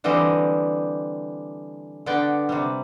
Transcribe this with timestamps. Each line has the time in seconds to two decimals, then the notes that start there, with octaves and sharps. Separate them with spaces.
0.04 D3 E3 G3 C4 G4 D#5
2.06 D3 B3 D5 G5
2.49 C3 G3